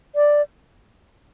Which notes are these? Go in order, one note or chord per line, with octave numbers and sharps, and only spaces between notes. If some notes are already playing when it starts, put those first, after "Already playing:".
D5